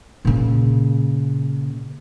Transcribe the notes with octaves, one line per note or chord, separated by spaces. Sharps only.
A#2 C#3